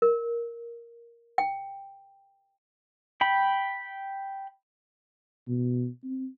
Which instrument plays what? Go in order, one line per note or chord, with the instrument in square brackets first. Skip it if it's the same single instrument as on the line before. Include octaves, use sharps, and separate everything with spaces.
[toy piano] A#4
G5
[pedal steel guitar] G5 B5
[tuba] B2
C4